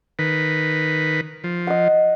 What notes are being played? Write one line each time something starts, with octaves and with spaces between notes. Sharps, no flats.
D#3 B4
F3
D#5 F#5